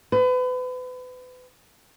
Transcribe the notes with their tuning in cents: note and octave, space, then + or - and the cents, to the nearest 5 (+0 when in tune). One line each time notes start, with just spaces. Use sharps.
B4 +35